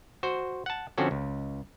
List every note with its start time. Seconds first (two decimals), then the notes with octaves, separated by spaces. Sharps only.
0.23 F#4 C5
0.66 F#5 A5
0.98 D3 F3 C4 C#4 F#4 A4
1.11 C#2